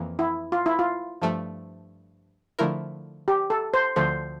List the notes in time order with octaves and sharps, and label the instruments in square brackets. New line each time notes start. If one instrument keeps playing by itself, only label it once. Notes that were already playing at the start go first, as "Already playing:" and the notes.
Already playing: [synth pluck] F2 E3 A#3
[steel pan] E4
F4
E4
F4
[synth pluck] G2 F3 A3
D3 F3 A3 E4 A#4
[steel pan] G4
A4
C5
[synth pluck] D2 D3 F3 A3 [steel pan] C5